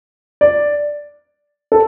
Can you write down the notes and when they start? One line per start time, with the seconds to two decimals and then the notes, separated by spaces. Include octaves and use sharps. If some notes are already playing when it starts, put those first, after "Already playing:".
0.41 D5
1.72 A4